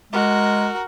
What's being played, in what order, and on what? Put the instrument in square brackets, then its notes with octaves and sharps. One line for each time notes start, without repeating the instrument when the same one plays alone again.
[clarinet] G#3 [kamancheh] F#4 A#4